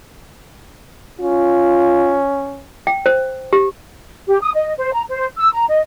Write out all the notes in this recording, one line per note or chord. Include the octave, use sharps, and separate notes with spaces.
C#4 F4
G5
C5
G4
G4
D#6
D#5
C5
A#5
C5
E6
A#5
D#5